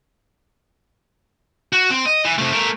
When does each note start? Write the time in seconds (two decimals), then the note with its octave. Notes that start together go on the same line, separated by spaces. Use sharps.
1.73 F#4
1.90 C4
2.06 D#5
2.25 E3
2.38 C3 A3
2.53 A3 A#4